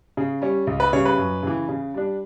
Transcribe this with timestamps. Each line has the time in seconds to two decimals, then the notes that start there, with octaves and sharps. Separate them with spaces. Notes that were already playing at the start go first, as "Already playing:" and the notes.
0.17 C#3
0.42 G3 C#4
0.67 C#2
0.80 B4
0.93 C#3 G3 C#5
1.05 B4
1.18 F#2
1.43 C#3 E3
1.69 C#3
1.94 G3 D4